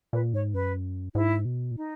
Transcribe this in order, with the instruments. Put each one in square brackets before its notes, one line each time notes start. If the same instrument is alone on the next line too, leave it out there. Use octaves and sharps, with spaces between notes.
[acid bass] A#2 [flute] B4
[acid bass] G#2 [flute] C#5
[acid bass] F#2 [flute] B4
[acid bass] G#2 [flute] E4
[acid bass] B2
A#2
[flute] D#4